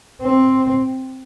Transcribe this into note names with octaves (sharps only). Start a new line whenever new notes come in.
C4